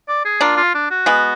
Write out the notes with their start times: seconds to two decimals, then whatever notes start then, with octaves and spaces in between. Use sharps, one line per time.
0.08 D5
0.25 G#4
0.41 A#3 D4 F4
0.57 F4
0.74 D4
0.91 F#4
1.06 G#3 B3